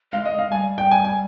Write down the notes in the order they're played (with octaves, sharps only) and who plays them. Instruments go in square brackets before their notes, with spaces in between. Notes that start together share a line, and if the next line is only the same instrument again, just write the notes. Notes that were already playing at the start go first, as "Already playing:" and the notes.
[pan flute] G#3 [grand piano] F5
[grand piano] D#5
F5
[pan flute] G3 [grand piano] G#5
[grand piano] G5
G#5
G#5